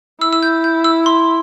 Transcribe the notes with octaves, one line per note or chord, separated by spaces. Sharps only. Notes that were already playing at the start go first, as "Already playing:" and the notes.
E4 E6
E6
G6
G6
E6
C6